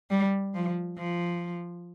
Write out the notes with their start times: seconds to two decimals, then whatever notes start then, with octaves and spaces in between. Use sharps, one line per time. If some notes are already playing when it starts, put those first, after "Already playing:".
0.10 G3
0.55 F3
0.98 F3